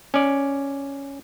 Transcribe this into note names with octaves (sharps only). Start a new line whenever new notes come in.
C#4 D5